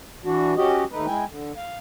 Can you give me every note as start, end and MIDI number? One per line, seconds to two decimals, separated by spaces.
0.25 0.54 52
0.25 0.54 62
0.25 0.54 66
0.57 0.84 61
0.57 0.84 66
0.57 0.84 67
0.57 0.84 75
0.92 1.06 39
0.92 1.06 57
0.92 1.06 63
0.92 1.06 71
1.07 1.24 56
1.07 1.24 64
1.07 1.24 79
1.07 1.24 80
1.29 1.52 50
1.56 1.78 77